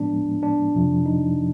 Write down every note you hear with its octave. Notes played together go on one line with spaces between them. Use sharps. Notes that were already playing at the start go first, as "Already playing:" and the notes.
Already playing: A2 F3 G#3 B3 D4
D4
F2 C3 F3
D#4